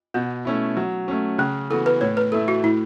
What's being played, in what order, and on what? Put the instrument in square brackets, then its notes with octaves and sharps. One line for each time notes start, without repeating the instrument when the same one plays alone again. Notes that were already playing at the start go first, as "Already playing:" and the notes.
[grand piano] B2 [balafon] B3
[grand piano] A3 C#4 E4
F#3
A3 C#4
[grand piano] C#3 [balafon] C#4
[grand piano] E3 B3 F#4 [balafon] A4
[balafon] B4
[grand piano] A2 [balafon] C#5
[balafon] B4
[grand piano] A3 E4 [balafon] A4
[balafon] F#4
[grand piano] A2 [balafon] E4